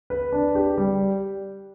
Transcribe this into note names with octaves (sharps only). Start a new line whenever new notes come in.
B4
D4
G4
G3